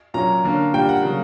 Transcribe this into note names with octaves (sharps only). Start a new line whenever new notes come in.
A#2 F#3 C#4 A#5
D3 A#3 C#4
A#2 G3 A#3 D4 G5
F#5
C#3 F#3 A#3